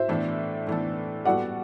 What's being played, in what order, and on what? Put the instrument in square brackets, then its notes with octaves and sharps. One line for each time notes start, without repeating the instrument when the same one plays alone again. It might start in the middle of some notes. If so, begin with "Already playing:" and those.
Already playing: [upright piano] C5 E5
[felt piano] A2 E3 B3 D4 A4
A2 E3 B3 D4 A4
[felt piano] G3 B3 F#4 A4 [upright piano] D5 F#5